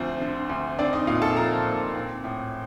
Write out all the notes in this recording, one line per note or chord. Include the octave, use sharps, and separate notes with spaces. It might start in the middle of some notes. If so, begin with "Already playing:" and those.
Already playing: D2 F3 C4 C5
D3
D2
C4 D4 D5
D#4 D#5
A#2 F4 F5
A4 A5
F3 A#4 A#5
A#2
C4
A2